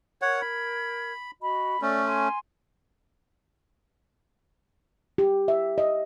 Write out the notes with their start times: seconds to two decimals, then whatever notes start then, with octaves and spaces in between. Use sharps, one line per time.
0.22 A#4 C#5 F#5 G#6
0.42 B5
1.41 F#4 D#5 B5
1.82 A3 C#4 A4 D5
2.06 G#5 C6
5.18 G4
5.48 E5
5.78 D#5